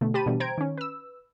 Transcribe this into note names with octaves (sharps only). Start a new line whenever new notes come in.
B2 D3 A3
G4 C5 A5 B5 D#7
B2 D3 E3 G3
C5 G5 A#5 G#6 D7
D#3 C#4
B4 E6